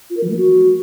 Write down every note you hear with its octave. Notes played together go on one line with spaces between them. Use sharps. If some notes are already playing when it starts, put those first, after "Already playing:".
F4
A#4
F3
A3
F#4